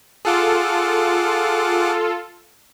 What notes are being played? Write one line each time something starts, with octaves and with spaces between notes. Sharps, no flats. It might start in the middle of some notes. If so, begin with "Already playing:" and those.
F4 G#4 A4 F#5 D6